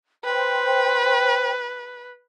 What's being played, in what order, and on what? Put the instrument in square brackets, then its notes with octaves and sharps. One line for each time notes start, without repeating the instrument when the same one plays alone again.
[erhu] B4 [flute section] C5 G5